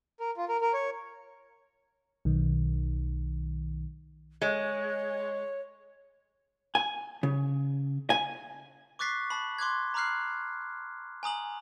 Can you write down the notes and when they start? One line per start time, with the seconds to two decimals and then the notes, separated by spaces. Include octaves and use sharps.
0.20 A#4
0.37 F4
0.49 A#4
0.61 A#4
0.73 C#5
2.25 B1 D#3
4.42 G#3 C#5
6.75 G#5
7.23 C#3
8.10 G#5
8.99 C#6 D6 F#6 A6 B6 C7
9.30 A5 B5
9.59 C6 D6 F#6 G#6
9.94 A#5 B5 D6 F6 F#6 C7
11.23 G#5 A#5 D#6 F#7